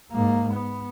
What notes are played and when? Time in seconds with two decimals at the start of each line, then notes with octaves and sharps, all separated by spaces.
0.12 G#2 A#3
0.54 B3